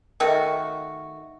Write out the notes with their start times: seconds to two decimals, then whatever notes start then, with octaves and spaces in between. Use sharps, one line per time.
0.20 D#3 A3 F#4